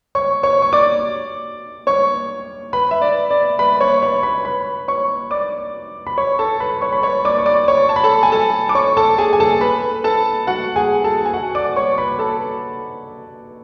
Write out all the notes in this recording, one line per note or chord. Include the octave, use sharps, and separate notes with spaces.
C#5 C#6
C#5 C#6
C#6
D5 D6
C#5 C#6
B4 B5
E5
D5
D5
B4 B5
C#5 C#6
C#5 C#6
B4 B5
B4 B5
C#5 C#6
D5 D6
B5
C#5 C#6
A4 A5
B4 B5
C#5 C#6
B5
C#5 C#6
D5 D6
C#6
D5 D6
C#5 C#6
A5
B5
A4 A5
G#5
A4 A5
D6
C#5 C#6
A4 A5
G#4 G#5
G#5
A4 A5
B4 B5
A4 A5
F#4 F#5
G#4 G#5
A4 A5
G#5
F#4 F#5
D5 D6
C#5 C#6
B4 B5
A4 A5